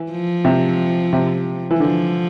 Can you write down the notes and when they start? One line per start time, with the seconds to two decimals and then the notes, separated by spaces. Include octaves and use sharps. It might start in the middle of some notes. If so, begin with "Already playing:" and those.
Already playing: E3
0.11 F3
0.45 C3
1.13 C3
1.71 E3
1.80 D3 F3